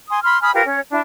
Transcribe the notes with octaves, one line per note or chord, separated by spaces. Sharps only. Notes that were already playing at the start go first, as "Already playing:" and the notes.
G#5 C6 D#6
B5 C6 F6
G#5 B5 D#6 F6
F4 G4 A#4 B4
C#4 C#5
D4 E4